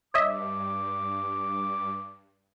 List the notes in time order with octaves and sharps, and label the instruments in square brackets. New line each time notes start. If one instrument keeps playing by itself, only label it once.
[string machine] G2 [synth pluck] C#5 D#5 E5 [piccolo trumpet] D6